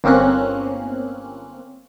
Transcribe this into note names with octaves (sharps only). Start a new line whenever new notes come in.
G1 A#3 C4 C#4 F#6